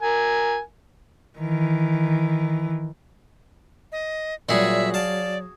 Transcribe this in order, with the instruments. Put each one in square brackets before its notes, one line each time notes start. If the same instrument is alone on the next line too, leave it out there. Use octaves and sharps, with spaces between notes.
[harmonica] A#4 G#5
[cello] D#3 E3
[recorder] D#5
[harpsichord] A#2 G3 [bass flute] F#3 [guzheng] F#4 G#4 [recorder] E5
[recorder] D5 [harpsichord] F5 A5